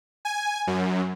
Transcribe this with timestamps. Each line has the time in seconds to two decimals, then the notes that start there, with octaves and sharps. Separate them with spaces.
0.25 G#5
0.67 F#2